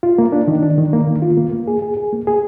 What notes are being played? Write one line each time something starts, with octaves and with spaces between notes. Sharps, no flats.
F4
A#3
D4
D#3
D4
D#3
A#3
D#3
F4
A#3
A#3
G#4
G#4
G#4
A#3
G#4